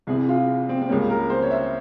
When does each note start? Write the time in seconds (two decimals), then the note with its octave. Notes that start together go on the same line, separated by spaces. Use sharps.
0.07 C2 C3 E3 G#4
0.28 F4
0.69 C4
0.82 C4
0.89 C#2 C#3 G3 A#3 C#4
1.10 A#4
1.30 C5
1.42 C#5
1.51 E5